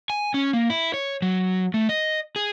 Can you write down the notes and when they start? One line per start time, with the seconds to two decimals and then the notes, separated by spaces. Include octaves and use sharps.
0.10 G#5
0.34 C#4
0.53 A#3
0.70 E4
0.94 C#5
1.22 F#3
1.74 A3
1.89 D#5
2.36 G#4